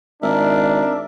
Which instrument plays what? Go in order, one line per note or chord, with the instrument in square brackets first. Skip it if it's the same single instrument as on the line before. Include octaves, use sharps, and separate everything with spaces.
[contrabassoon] G#1 [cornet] D4 [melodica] A#4 E5